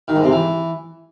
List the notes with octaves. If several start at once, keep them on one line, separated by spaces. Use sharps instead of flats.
D#3
G#2
C3
E3